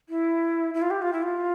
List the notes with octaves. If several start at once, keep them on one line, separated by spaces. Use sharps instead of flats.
E4
E4
F4
G4
F4
E4
F4